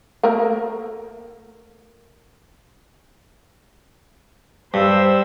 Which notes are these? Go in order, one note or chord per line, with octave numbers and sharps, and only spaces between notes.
A3 A#3 A#4
G2 C5 E6